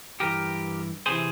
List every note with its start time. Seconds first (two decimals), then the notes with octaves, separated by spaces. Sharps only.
0.20 G2 E3 G4 A#4
1.06 C3 E3 G#4 C5